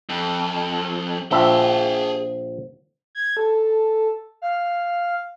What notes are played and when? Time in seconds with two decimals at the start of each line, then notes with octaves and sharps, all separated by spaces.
0.09 F2
1.31 A#1 F3 G#4 E5 G5
3.15 G#6
3.37 A4
4.42 F5